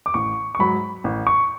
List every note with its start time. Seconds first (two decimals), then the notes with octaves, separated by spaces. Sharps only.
0.06 D6
0.14 A1 C#6
0.55 C#6
0.59 G#2 F#3 B5
1.04 A1
1.27 C#6